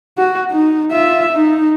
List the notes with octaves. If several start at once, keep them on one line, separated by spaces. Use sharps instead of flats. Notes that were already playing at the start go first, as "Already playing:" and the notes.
F#4
D#4
F4 E5
D#4